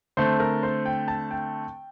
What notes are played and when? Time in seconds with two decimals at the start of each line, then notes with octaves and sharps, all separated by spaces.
0.17 D3 A3 C4 C5
0.40 A#4
0.63 C5
0.85 G5
1.08 A5
1.31 G5